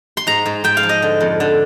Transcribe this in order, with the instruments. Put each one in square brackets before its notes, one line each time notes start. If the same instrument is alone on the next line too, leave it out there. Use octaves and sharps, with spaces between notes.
[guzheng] C6
G#2 A#5
G#2
G#2 G5
F5
F3
D#5
D3
F2
D3